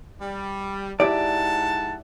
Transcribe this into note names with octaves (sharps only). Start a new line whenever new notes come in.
G3
G#2 E4 G4 D5 F#5 A5